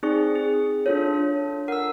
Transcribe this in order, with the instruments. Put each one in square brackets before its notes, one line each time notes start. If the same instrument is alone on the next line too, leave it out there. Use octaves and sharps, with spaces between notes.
[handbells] C4 G#4 [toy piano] D#4 D5 C#6
[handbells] G#4
[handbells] D4 F4 A4 [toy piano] C#5
[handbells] A#4 E6 [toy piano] F#5